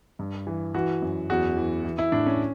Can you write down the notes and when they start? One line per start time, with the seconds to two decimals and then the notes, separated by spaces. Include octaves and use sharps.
0.19 G2
0.47 E3
0.75 E3 F#4
1.02 F#2
1.30 E2 F#4
1.57 E3
1.85 E3
1.98 E4
2.12 A2 D4
2.26 C#4